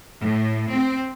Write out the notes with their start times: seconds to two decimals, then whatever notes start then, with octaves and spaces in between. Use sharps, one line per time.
0.22 A2
0.71 C4